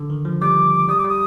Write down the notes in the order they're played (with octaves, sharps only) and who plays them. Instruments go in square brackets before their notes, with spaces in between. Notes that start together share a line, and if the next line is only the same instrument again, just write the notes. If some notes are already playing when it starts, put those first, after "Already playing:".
Already playing: [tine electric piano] D3
D#3
F3
[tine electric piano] G3 [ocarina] D6
[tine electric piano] G3 [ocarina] D#6
[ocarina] D6
[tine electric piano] G3 [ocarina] D#6